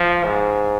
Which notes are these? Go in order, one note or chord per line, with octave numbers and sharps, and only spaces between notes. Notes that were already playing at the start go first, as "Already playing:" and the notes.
Already playing: F3
G#2